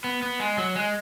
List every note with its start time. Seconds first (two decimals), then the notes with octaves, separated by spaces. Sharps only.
0.04 B3
0.22 B3
0.40 G#3
0.57 F#3
0.76 G#3